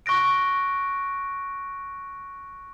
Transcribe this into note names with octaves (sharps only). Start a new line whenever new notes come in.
C#6 F#6 A#6 D7